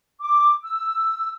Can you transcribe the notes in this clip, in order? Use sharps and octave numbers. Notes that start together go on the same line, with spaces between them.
D6
E6